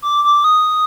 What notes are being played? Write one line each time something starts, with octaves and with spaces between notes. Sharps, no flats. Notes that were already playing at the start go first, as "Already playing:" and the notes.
D6
D6
D#6